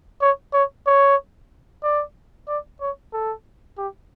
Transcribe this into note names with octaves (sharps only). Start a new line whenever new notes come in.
C#5
C#5
C#5
D5
D5
C#5
A4
G4